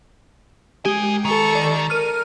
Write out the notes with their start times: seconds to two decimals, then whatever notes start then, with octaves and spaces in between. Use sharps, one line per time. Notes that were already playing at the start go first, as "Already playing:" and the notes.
0.85 G#3 G4 A#4 G#5
1.25 D#3 A4 C#6
1.55 D5
1.90 A#4 F6 D#7